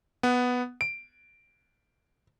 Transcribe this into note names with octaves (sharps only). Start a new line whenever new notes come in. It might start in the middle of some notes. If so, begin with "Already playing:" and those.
B3 F#5
D7